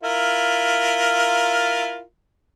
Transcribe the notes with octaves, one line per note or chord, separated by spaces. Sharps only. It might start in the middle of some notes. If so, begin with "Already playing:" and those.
E4 F4 A#4